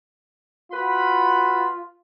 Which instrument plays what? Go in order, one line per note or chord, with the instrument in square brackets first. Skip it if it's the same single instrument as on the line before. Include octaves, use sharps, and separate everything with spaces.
[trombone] F4 [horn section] F#4 B4 B5